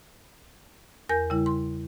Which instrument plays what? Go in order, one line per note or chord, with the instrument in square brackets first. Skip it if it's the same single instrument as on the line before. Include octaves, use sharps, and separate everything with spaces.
[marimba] E2 A#4 G#5 G6
C#3 G3 E4
C6